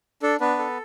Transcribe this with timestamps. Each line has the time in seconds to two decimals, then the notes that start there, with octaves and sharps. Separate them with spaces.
0.23 D4 A4
0.40 B3 D4 B4
0.59 A4